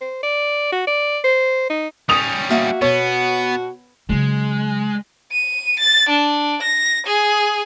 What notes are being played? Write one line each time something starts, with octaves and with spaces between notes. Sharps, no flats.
C5
D5
F#4
D5
C5
D#4
G3 C#4 D#6 F7
A#3 F#4 E5 F#5
B2 B3 C#5
C#3 F#3 G#3
D#7
A6
D4
A#6
G#4